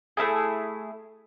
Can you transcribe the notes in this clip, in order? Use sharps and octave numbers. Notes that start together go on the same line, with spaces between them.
A3 C#4 E4 G#4